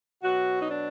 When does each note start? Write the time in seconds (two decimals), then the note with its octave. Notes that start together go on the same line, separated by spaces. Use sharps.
0.23 B2 F#3 F#4
0.61 D#4
0.68 D4